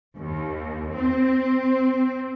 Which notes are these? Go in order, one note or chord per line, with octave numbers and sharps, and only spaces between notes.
D#2
C4